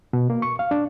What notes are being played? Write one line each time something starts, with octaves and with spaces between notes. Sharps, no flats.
B2
A#3
C#6
F5
D4